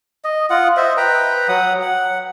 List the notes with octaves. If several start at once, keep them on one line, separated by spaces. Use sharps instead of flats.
D#5
F4 F#5
C5 D#5 E5
B4 G5 A#5
F#3 F#5 D#6
F#5